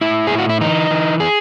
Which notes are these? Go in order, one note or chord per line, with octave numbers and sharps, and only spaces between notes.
A2 E4
A2 G#4
F#4
E4
E3 D#4
E3
G#4